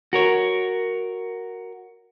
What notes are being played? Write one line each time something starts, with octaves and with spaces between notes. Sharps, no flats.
F#4 A#4 C#5